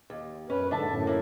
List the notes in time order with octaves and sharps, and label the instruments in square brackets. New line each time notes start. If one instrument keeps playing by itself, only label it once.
[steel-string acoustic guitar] D#2
[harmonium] F#2 B4 [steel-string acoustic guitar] C#4
[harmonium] G#2 D3 [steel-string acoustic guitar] D4 E5 A5
[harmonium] F#2 A2
[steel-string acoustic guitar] A#3 E4